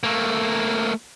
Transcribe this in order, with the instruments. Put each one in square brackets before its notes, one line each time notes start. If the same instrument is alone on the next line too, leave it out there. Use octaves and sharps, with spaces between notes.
[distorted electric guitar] A3 A#3